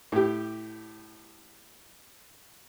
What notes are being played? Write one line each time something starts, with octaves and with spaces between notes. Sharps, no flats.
A2 G4